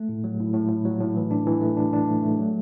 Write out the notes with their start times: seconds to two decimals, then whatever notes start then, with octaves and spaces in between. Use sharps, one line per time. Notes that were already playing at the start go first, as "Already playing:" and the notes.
Already playing: A3
0.09 A2
0.24 F#3
0.40 A2
0.54 A2
0.69 A2
0.85 F#3
1.00 A2
1.16 E3
1.31 D4
1.47 E3
1.61 A3
1.77 D4
1.93 D4
2.08 A3
2.23 A3
2.38 F#3